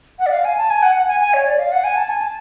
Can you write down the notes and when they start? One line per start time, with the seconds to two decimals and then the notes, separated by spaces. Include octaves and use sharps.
0.19 F#5
0.26 D5
0.31 F5
0.44 G#5
0.57 A5
0.70 G#5
0.82 F#5
0.95 F#5
1.07 G#5
1.20 G#5
1.34 C#5
1.46 D5
1.59 F5
1.72 F#5
1.84 G#5
1.97 A5
2.09 G#5
2.21 A5